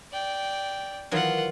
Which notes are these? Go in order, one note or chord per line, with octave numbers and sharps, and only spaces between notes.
D5 G5
D#3 E3 F#3 F4 F#5